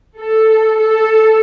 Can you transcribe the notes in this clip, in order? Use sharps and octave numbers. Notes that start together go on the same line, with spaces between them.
A4
A4